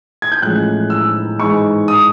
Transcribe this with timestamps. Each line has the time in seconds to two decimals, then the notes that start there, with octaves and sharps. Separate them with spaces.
0.22 G#6
0.32 G6
0.42 A1 A2 F3 G#3 F#6
0.90 E6
1.39 G#2 E3 G#3 C#6
1.88 D#6